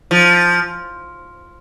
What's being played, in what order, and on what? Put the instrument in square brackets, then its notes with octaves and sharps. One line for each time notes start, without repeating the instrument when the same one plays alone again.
[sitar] F3